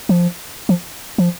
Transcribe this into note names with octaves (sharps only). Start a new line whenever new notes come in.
F3
F3
F3